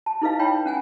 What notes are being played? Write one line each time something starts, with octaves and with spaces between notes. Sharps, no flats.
A5
D#4 E4 A4 B4 D#5 F5
E4 C#5 G5 A5 B5
C#4 F#5 G#5